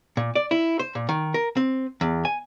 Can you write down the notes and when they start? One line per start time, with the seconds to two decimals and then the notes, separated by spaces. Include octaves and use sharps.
0.17 A#2
0.35 D5
0.51 E4
0.79 C5
0.95 A#2
1.09 D#3
1.34 A#4
1.57 C4
2.01 E2
2.25 G#5